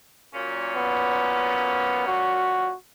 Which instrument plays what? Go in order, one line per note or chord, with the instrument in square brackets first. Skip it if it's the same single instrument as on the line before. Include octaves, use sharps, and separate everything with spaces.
[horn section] A#2 F#3 C#4
[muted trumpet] B3
F#4